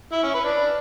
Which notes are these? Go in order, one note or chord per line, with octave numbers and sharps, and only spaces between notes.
E4
C#4
B4
D4